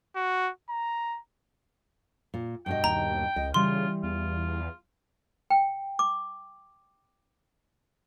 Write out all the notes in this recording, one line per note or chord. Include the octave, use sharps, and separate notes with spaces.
F#4
A#5
A#2
G2 B2 D#5 G5
D#2 A#5
C#2 D#5
C#3 E3 G3 F4 C6
E2 F4
G5
D6